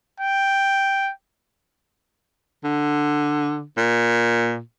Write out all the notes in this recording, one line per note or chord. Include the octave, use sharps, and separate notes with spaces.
G5
D3
A#2